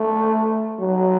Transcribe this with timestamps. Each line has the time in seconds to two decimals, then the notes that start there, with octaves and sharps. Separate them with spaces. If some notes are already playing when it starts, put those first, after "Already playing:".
Already playing: A3
0.80 F#3